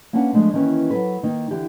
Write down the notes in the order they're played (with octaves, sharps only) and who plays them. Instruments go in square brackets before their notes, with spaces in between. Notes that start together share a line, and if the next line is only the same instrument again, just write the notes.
[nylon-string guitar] A#3 C#4 D4 B4 F#5 A5
F3 G#3 A3 C4 D4
D#3 E3 A#3 C#4 B4
F#3 A4 B4
D#3 A#3 D#4
D3 E3 G4